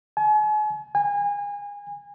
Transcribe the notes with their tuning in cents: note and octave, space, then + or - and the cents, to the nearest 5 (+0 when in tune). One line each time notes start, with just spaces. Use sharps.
G#5 +40
G#5 -30